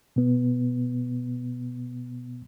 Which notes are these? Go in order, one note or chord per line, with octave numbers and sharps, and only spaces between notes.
B2 B3